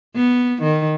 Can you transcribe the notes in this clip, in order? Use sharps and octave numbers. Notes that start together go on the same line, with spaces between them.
B3
D#3